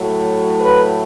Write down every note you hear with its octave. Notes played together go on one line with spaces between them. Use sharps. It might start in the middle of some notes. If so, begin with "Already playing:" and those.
Already playing: A2 F#3 A3
B4